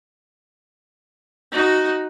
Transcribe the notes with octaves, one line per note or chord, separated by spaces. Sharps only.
D#4 F#4